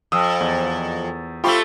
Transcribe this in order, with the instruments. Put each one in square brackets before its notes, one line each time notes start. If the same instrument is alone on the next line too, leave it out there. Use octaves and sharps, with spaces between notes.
[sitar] F2 [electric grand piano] D#6 E6
[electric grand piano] E2
[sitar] A3 C4 G4 [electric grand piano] F4 B5 C#6